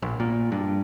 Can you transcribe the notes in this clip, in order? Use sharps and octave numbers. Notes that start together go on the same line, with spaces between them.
A#1
A#2
G2